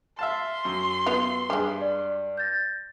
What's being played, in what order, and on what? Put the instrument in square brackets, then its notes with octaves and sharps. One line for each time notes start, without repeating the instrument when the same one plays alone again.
[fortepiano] E5 F5 A5 [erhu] C6
[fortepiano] F#2
[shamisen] B3 F4 B4
[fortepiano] G2 [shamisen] G#3 G4
[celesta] D5
G6 A6 A#6